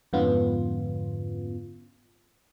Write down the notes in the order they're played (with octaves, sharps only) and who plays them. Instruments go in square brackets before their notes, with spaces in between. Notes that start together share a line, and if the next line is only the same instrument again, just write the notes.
[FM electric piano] F2 G#2 D3 B3 C#4 F4